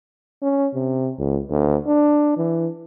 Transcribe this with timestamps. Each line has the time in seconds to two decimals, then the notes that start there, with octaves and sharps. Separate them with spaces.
0.42 C#4
0.75 C3
1.19 C#2
1.50 D2
1.87 D4
2.37 E3